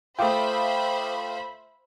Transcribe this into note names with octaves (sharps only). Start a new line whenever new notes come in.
A3 F4 C5 E5 G5 B5 D6 D#6